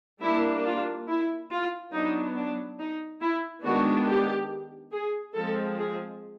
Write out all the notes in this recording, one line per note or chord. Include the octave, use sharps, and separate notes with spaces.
G3 A#3 D4 E4
F4
E4
F4
F#3 B3 D4 D#4
D4
D#4
E4
D#3 G#3 B3 D4 F#4
G4
G#4
F3 G#3 C4 A4
G#4